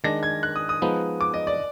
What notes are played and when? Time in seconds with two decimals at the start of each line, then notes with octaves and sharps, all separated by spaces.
0.04 D#3 G#3 D4 A#6
0.23 G#6
0.43 F#6
0.56 D#6
0.69 D#6
0.82 F3 G#3 B3 D#4
1.21 D6
1.34 D#5
1.47 D5